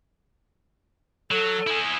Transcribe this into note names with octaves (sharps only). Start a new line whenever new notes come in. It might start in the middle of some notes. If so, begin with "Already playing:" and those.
F#3 A4
E4 G#4